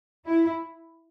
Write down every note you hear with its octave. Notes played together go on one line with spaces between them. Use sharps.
E4